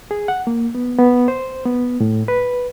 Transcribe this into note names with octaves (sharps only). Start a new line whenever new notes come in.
G#4
F#5
A#3
B3
B3
C5
B3
A2
B4